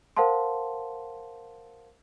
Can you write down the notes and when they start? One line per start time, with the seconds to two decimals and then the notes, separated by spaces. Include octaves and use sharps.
0.17 A#4 C5 F5 F#5 A5 C6